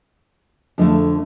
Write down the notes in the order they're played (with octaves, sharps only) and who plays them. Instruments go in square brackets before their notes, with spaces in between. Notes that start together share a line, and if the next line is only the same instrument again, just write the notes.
[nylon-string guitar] F2 D3 A3